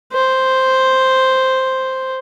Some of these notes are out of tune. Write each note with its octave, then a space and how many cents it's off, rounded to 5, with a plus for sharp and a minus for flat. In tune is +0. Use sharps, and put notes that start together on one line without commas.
C5 +0